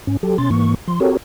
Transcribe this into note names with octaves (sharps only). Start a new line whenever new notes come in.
G#2 C#4
F#3 G4 A4
B2 C#4 C6 A6
G#2 E3 A#3 C#6
F3 C6
C4 F#4 G4 A4 A#4 C#5